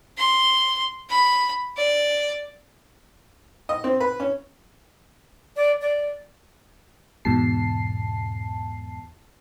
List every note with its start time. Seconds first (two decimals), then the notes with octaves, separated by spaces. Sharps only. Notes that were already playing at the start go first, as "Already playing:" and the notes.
0.18 C6
1.10 B5
1.77 D5
3.69 D#5
3.84 C4
4.00 B4
4.20 C#4
5.56 D5
5.81 D5
7.25 E2 G#2 B2 A5 C7